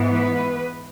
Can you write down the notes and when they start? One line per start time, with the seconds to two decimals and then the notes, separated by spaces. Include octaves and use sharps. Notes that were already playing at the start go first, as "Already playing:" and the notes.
Already playing: G#2 E3 B3
0.14 B4